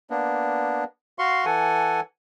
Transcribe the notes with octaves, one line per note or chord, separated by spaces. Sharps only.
A#3 B3 D4
F#4 F5 C6 C#6
E3 A4 F#5 G#5